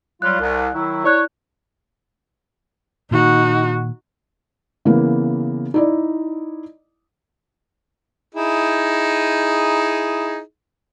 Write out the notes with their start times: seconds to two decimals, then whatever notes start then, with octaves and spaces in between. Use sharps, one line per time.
0.22 F#3 G3 F4 F#6
0.39 C2
0.74 D#3 F#3 E4
1.04 E4 C#5 D5 F#6
3.11 A#2 D#3 D#4 F#4
4.85 C#3 E3 A#3 B3
5.74 D#4 E4 D5
8.35 D#4 E4 G#4